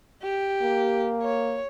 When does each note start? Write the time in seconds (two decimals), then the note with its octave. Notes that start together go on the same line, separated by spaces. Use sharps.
0.22 G4
0.62 A#3
1.23 C#5